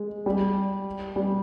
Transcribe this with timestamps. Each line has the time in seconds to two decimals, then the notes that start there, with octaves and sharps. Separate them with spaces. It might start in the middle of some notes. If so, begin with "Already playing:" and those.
Already playing: G#3
0.26 G3
1.16 G3